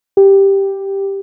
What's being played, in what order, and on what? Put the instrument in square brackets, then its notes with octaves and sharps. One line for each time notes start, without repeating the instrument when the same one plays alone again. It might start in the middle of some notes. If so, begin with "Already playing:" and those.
[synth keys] G4